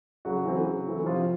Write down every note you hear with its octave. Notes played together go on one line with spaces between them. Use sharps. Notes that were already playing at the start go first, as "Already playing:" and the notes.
C#3 F#3 F#4
E3 A3 C4
C#3
E3 A3 C4
C3 F3 F4